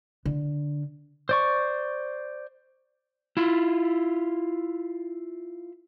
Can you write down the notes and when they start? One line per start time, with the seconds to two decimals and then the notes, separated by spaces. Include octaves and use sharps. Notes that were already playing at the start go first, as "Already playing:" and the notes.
0.25 D3
1.29 C5 D5 C#6
3.37 E4 F4